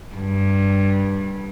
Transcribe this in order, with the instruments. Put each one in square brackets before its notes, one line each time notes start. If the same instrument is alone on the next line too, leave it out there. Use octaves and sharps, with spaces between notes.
[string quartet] G2